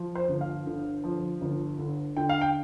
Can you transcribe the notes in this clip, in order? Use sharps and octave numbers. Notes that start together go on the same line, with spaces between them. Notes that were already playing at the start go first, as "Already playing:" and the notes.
Already playing: F3
C5
G1
F5
D3
F3
G1
D3
D3 G5
F5
G5